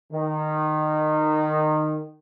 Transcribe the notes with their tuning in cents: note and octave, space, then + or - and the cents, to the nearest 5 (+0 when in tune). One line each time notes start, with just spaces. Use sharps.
D#3 -20